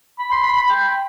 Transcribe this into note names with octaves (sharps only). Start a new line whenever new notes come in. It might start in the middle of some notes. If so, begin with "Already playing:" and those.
B5
C6
B5
B5
G5